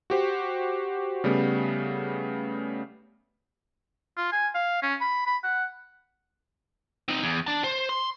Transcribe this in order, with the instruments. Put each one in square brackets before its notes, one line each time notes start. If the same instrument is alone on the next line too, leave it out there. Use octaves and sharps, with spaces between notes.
[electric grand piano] F#4 G4 C5
C#3 G3 A3 B3
[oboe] F4
G#5
F5
C#4
B5
B5
F#5
[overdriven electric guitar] C4 D#4
E2
D4 A5
C5
C6